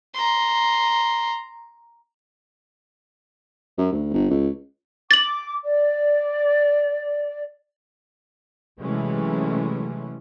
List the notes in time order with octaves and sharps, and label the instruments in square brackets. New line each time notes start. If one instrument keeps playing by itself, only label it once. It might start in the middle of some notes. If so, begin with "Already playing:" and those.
[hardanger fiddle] A#5 C6
[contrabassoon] F#2
D2
G1
C#2
[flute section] D6 [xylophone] A6 F#7
[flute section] D5
[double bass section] C3 E3 F#3 G#3 A3 C#4